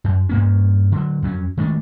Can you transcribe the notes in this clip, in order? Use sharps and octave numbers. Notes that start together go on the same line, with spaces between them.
F#2
G2 A#3 C#4
D3 F#3
F2 F#3 C4 C#4
D#3 G#3 A3 D4